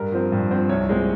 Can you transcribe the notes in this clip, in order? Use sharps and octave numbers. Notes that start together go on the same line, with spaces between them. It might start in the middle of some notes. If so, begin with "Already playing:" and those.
Already playing: G2 A#4
F3 C4
G2
F3 C4
C2 C#5
A#2 G#3 C4